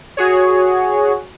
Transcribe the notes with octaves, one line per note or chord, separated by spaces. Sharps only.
F#4 G#4 C#5